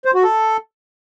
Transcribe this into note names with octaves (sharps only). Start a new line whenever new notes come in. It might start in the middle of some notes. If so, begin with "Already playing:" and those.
C5
F#4
A4